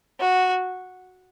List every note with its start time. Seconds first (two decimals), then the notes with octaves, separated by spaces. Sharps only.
0.21 F#4